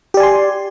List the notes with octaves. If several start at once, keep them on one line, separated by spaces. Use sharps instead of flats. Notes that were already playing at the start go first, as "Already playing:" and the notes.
G4 D5 G#5 C6